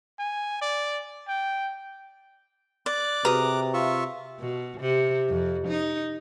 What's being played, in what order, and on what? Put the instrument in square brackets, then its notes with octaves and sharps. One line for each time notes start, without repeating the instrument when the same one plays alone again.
[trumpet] G#5
D5
G5
[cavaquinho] D5 [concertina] D6 F#6
[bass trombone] C3 [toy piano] F#4 G#4 B4 [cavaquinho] A#5 D#6
[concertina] F4 E5 C#6
[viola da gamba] B2
C3
F2
D#4